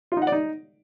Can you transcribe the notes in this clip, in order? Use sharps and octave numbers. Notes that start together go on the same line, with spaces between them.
F4
D#4
F#5
D5
D#4